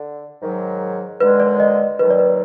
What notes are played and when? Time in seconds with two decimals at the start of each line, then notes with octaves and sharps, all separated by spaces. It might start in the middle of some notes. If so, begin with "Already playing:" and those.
Already playing: D3
0.41 G#2 D#3 F#3
1.20 D#2 D3 G#3 B4
1.40 D5
1.60 D#5
1.99 D#2 D#3 F#3 B4
2.10 D5
2.19 B4